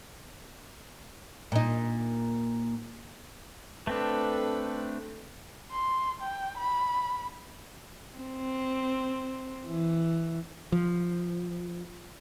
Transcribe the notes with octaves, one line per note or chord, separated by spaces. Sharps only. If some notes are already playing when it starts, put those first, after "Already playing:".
A#2 D#4
A3 C4 D4 A4 B4
C6
G5
B5
C4
E3
F3